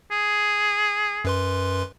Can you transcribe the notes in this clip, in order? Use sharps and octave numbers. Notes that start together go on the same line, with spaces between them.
G#4
F#2 B4 C6